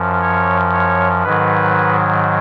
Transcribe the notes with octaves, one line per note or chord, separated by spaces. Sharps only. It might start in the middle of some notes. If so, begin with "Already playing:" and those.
Already playing: F#2 F3
C#5
C#5
G#2 D#3 F#3 B4